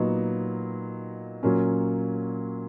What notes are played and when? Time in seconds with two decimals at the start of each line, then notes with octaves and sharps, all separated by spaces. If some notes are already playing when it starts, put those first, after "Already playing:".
Already playing: A#2 F#3 B3 D#4
1.43 A#2 F#3 A#3 C#4